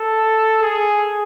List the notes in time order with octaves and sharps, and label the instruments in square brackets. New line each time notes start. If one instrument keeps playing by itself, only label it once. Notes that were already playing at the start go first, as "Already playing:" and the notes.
Already playing: [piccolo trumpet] A4
G#4